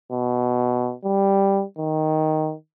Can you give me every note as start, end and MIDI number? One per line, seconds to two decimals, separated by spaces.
0.12 0.93 47
1.04 1.63 55
1.78 2.54 51